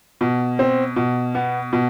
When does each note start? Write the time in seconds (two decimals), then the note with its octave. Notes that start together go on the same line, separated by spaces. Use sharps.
0.21 B2
0.59 C4
0.96 B2
1.35 B3
1.73 B2